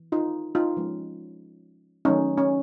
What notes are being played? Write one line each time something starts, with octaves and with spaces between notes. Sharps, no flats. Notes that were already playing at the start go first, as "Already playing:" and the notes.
Already playing: E3
D#4 F4
D#4 F4
F3 G#3 C#4
D#3 F#3 A3 C#4 D#4
C#4